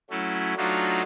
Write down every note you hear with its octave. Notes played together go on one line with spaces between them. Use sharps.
F#3 A3 C#4 E4
F#3 A3 D4 D#4 F4 F#4